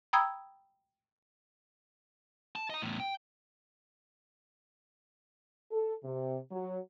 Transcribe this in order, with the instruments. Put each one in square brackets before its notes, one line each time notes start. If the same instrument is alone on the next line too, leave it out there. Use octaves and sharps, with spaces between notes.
[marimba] G5 A#5 B5 D#6 E6 G#6
[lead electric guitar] A5
D#5 A#5
E2 A2
G5
[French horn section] A4
C3
F#3